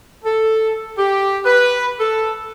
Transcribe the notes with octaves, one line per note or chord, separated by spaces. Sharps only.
A4
G4
B4
A4